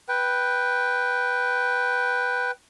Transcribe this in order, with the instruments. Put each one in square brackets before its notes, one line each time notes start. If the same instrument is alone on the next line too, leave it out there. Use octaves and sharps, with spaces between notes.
[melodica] B4 G5